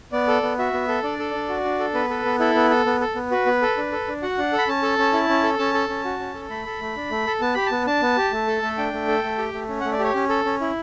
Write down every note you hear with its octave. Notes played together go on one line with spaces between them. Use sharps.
B3 D5
A4
B3
F#4 E5
B3
A4
D4 D5
A4
D4
F#4
D4
A4
B3 B4
A4
B3
E4 A4
B3
A4
B3
A4
B3
F#4 B4
B3
A4
D4
A4
D4
F#4 F#5
D4
A4
B5
C#4 A5
A4
C#4
E4
C#4
A4
C#4 A5
A4
C#4
F#4
C#4
A4
A3 B5
A4
A3
D4
A3
A4
B3 A5
G4 B5
A5
B3
D4 A5
B3
G4
A3
A4
A3
D4 G5
A3
A4
A3
G4
A3
C#4
A3 F#5
D5
G4 C#5
C#4
A4
C#4
E4